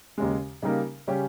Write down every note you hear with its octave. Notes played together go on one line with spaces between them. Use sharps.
D#2 C#3 G#3
C#3 G3 A#3 D#4 A#4
C#3 G3 C#4 G4